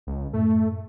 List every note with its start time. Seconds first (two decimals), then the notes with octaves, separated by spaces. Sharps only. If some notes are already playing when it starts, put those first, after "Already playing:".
0.07 C#2
0.33 F#2 A2 A3